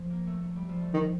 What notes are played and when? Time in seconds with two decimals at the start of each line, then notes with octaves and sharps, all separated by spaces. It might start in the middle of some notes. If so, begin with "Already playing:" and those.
Already playing: F3
0.10 A#3
0.27 A3
0.43 A3
0.56 G3
0.69 F3
0.81 A3
0.94 D#3